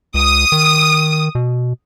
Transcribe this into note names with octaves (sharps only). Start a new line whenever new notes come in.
C#2 D#6
D#3
B2